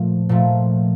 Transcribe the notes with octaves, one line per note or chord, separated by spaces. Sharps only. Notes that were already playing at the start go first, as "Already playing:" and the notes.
Already playing: A#2 F3 A3
A#2 F3 A3